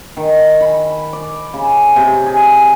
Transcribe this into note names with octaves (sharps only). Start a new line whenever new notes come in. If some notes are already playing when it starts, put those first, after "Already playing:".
D#3
B5
D5
C#3
C3
G#4